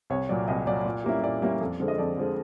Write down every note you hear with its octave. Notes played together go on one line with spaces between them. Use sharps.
C2 C#5
A#2 F#3 D5
C2 D#5
A#2 F#3 D5
A#2
G3 A#3 C#4 E4
A#2 D5
G3 A#3 C#4 E4
F2
D3 F3 G#3
D#5
F2 D5
D3 F3 G#3